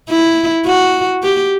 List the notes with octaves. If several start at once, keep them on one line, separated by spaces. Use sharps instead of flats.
E4
F#4
G4